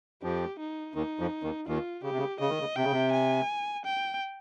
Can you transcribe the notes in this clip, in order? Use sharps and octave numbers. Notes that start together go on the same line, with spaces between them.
F2 F3 G4
D#4
D#2 D#3 D#4
F2 F3
D#2 D#3
D#2 D#3 F4
C#3 G4
C3
C#3
C#3 D#5
D#3
C#3
C3 G5
C#3
C3
G#5
G5